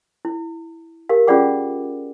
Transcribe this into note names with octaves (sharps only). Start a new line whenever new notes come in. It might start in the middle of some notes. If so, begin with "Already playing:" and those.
E4
G4 A#4 F5
C#4 F4 G#4 D5 F#5 D6